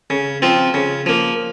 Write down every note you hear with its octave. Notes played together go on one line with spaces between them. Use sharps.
C#3
F3 C4 F4
C#3
F3 A#3